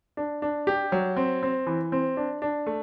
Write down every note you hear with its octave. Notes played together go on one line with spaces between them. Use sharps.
D4
D4
G4
F#3
C4
C4
E3
C4
D4
D4
A3